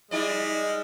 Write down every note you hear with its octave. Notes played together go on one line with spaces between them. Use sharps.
G3 G#3 D#4 D5